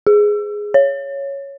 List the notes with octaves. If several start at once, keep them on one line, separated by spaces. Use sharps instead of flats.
G#4
C#5